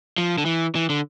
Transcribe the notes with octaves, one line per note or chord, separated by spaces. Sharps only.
F3
D3
E3
E3
D3